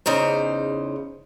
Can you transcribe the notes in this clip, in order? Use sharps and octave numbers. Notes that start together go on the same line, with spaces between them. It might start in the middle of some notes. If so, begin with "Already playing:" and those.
E2 C#3 D#4 C5